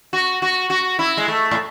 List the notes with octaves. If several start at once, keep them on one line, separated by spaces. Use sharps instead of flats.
F#4
F#4
F#4
E4
G#3
A3
A2